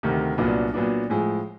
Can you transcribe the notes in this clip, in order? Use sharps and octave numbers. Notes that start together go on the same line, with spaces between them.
D2 C3 D#3
C2 A#2 F#3 B3 D4
A#2 F#3 B3 D4
A2 F3 G#3